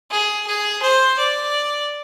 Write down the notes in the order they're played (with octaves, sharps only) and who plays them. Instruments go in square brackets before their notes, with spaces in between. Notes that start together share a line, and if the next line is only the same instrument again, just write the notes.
[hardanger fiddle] G#4
G#4
C5
D5